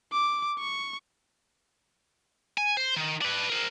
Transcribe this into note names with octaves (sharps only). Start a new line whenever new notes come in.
D6
C#6
G#5
C5
D#3
D4 B4
A#4 C5